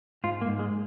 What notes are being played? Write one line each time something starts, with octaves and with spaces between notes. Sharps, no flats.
G#2 F4
A#3
G#2
G#3